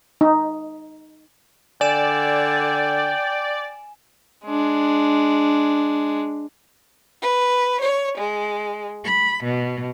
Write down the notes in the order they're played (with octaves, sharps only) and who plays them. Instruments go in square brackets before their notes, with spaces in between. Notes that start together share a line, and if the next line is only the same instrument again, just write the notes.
[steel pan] D#4
[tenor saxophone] D3 [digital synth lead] D5 [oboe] G5 [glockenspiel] G#5 E7
[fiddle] G#3 D4
[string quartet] B4
C#5
G#3
B5
B2